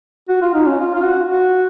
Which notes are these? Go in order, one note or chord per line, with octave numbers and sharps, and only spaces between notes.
F#4
F4
D#4
C#4
F4
F4
F#4
F#4